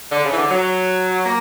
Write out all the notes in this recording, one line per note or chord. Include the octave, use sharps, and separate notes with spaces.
D3
C#3
E3
D3
F#3
A#3